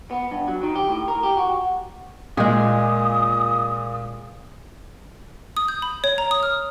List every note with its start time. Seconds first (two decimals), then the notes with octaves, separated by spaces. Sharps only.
0.11 B3
0.31 G2
0.48 F#3
0.63 D#3
0.75 G4
0.89 A2
1.08 A#4
1.23 G4
1.37 F#4
2.37 A#2 G#3 G#4 D#6
5.57 D#6
5.68 G6
5.82 B5
6.04 C#5
6.18 A#5
6.31 D#6
6.43 F6